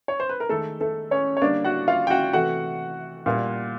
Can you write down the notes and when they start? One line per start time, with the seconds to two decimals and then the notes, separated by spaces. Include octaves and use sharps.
0.08 C#5
0.20 C5
0.29 B4
0.40 A#4
0.49 D#3 G#3 A3 A4
0.80 A3 A4
1.11 C#4 C#5
1.37 C#5
1.42 D3 G3 A#3 D4 D5
1.65 F#4 F#5
1.88 F4 F5
2.07 G5
2.10 F#4 F#5
2.33 C3 E3 A3 F#4 F#5
3.26 A#2 G3 A#3